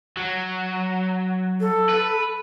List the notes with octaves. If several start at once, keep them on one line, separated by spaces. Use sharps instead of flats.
F#3
A4
B4